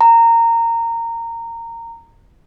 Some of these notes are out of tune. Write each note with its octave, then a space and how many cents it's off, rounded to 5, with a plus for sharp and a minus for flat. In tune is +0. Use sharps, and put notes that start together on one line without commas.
A#5 -20